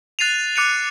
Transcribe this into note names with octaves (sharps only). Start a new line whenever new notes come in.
F#6 A6 C7 D#7 F7
D6 F#6 C#7 D#7 F7